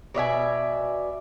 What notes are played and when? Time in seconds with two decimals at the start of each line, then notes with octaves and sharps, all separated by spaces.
0.14 B2 D5 E5 G#5